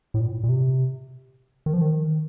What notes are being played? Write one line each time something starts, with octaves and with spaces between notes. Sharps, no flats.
A2
A#2
A#2
C3
D#3
F3
D#3